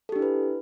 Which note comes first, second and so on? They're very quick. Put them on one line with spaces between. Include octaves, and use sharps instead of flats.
A4 G4 D4 E4 B4